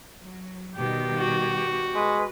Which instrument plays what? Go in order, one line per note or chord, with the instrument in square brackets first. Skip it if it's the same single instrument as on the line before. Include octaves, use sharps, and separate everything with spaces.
[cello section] F#3
[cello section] B2 D#3 G3 [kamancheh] G4
[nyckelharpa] F#4
[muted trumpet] G#3 [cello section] B4